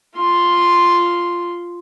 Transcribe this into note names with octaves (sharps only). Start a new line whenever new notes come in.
F4 C6